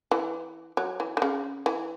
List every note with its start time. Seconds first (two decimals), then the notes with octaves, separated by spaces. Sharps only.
0.11 E3
0.77 F#3
1.00 E3
1.17 D#3
1.22 C#3
1.66 E3